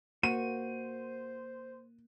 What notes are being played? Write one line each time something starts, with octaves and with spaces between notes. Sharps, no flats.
A#3 F#4 C5 D#7